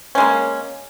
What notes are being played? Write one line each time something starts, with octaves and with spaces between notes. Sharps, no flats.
G#3 A#3 C#4